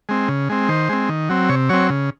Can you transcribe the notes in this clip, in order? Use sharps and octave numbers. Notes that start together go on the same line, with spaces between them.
G#3 C4
C#3
G#3 C4
D#3 C5
G#3 C4
D#3
F#3 C4
C3 C#5
F#3 C4 C#5
C#3